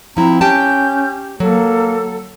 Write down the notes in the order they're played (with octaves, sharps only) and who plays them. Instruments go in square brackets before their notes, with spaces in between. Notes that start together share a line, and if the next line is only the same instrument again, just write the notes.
[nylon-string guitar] F3 E4 [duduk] C4 [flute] A#5
[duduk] C#4 [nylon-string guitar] G4 G5 A5 [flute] G6
[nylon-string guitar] F#3 [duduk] A#3 [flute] A4